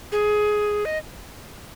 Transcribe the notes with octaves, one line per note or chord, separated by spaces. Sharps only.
G#4
D#5